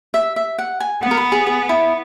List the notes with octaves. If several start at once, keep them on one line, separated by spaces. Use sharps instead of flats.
E5
E5
F#5
G#5
B3 F#5
A#4
B4
G#4
G#4
E4